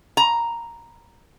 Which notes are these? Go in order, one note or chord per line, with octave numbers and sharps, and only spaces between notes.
A#5